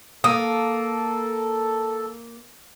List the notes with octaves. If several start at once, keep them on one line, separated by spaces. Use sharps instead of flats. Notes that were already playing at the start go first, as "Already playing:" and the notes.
A#3 A4 D#6